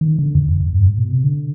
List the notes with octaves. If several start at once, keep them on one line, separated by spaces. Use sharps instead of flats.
D#3
D3
F2
F2
F2
G2
G#2
B2
C3
D3